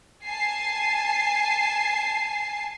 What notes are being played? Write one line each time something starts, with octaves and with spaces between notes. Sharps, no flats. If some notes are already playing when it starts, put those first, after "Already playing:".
G#5 A5 C7